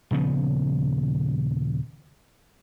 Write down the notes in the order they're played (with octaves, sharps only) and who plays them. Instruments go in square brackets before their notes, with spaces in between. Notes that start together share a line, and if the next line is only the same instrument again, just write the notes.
[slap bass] D#1 C#3 F3 B3